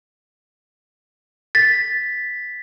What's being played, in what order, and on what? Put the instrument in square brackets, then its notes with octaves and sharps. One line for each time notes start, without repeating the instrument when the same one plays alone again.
[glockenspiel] A6 B6